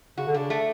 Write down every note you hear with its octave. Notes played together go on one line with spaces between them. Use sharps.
C#3 F#4
D3
C#3 D4
A3